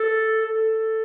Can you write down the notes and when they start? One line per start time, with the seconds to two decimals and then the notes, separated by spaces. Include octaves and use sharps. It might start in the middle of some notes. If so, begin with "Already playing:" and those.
Already playing: A4
0.41 A4